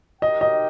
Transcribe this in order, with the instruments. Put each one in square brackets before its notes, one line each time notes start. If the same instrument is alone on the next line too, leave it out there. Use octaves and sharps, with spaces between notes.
[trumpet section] D#4 G4 A#4 G5 [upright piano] D#5
[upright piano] D#5